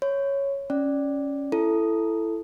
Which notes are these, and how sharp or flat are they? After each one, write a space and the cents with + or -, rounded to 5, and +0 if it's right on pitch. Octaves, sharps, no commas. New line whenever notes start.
C#5 +0 B5 +40
C#4 +0 D5 +0
E4 +15 A4 +0